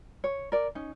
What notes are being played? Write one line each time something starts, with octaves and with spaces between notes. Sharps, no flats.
C#5
A#4 D5
C#4 D#4